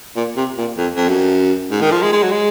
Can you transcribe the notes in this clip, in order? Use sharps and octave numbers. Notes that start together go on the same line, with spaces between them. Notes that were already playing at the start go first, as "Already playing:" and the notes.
A#2
C3
A#2
F2
F2
F#2
G#2
D#3
F3
G#3
G#3
F#3
G#3